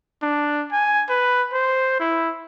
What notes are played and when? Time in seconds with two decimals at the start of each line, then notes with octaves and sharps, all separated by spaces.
0.22 D4
0.72 G#5
1.09 B4
1.53 C5
2.00 E4